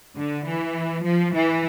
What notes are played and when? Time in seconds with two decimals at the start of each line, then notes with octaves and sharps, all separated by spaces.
0.16 D3
0.46 E3
1.04 F3
1.34 E3